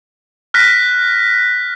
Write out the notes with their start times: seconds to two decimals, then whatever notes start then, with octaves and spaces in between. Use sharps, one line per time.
0.54 F6 F#6 A#6 B6